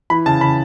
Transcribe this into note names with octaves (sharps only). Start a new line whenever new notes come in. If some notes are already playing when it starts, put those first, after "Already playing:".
E3 B5
C#3 A5
C#3 B5